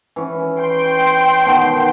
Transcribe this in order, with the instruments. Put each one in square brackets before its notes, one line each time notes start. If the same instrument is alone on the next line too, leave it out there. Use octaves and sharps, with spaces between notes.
[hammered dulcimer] E3 C#4
[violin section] G5 C6
[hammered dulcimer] B2 D#3